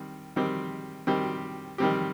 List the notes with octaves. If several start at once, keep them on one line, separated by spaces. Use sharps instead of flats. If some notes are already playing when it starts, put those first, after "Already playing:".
Already playing: D#3 G3 C4
D#3 G3 C4 G4
D#3 G3 C4 G4
D#3 G3 C4 G4